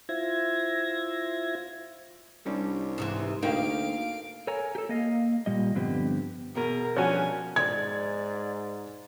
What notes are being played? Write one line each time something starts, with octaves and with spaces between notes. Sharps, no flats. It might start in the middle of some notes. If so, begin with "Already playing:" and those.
E4 F4 C5 E5 G#6 A#6
C2 G3 C#4 D4
G#2 C3 E3
D2 A#3 D#4 F5 G5 D7
A4 A#4 C#5 G#5 A#5
G4 A4
A#3 D#5 F5
A#2 G3 D#5
G2 D3 F3 B3 C4 G4
E2 B2 G#4 A#4
G2 D3 F3 C#4 F#4 G#5
G#2 D5 G#6